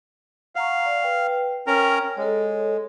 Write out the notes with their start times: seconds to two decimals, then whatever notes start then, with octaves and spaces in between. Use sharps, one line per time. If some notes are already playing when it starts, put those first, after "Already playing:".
0.55 F5 F#5 A#5 C#6
0.86 D5
1.03 B4 G5
1.67 C#4 A#4 G5 A#5
2.17 G#3 A4 C#5